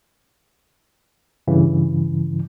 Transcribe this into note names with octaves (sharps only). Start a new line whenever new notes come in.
G2 C#3 E3